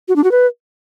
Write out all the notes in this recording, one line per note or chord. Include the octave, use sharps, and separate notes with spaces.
F#4
D4
F#4
B4